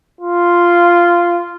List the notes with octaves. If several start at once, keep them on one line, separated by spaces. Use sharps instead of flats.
F4